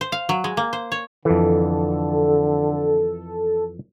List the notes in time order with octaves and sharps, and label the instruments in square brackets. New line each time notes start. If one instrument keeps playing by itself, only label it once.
[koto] C5
F5
F#3
G#3
A#3
C5
C#5
[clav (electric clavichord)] F2 E3 [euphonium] D3 [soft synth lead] A4